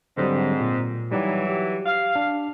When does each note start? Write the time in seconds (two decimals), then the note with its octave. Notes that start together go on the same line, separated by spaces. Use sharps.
0.18 G#2 D3 F#3 G3 C4
0.60 A#2
1.12 E3 F#3 G3 D#4 G4
1.49 G4
1.86 F5
2.15 D4